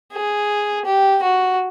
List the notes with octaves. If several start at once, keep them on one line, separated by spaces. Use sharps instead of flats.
G#4
G4
F#4